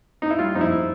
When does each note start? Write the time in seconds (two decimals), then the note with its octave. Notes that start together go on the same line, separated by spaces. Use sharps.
0.22 D#4
0.30 E4
0.38 G2 F4
0.55 F3 D#4
0.61 E4